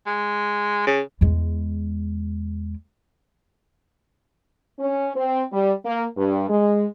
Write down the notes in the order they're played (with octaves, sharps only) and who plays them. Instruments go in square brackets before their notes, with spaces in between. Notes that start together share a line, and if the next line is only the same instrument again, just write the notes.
[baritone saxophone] G#3
C#3
[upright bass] E2 G#3
[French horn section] C#4
C4
G3
A#3
G2
G#3